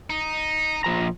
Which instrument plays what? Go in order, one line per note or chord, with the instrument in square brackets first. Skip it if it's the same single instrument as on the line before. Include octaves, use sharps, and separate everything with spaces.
[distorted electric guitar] D#4
[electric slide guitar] A#2 F3 A#5